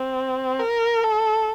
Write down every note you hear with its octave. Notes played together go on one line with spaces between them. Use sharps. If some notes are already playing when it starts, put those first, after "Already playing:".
Already playing: C4
A#4
A4